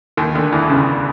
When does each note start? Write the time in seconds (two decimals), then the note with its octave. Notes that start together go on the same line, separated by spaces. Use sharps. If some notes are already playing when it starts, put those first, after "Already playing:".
0.17 D#2 D#3
0.35 D2 D3
0.52 E2 E3
0.70 C#2 C#3